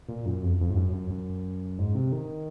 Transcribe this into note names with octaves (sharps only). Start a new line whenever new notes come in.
A#2
F#2
F2
F2
G#2
F#2
F#2
F#2
G#2
C3
D#3